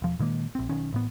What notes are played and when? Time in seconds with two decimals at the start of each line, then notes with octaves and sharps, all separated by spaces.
0.02 E1 F3
0.19 A#2 D#3 G#3 A#3
0.55 A#1 C4
0.69 B1 D#3 C#4
0.93 A1 A2 B3